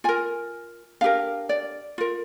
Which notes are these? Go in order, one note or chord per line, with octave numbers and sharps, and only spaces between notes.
F4 A#4 G#5
D4 G4 A#4 F5
D5
F4 A#4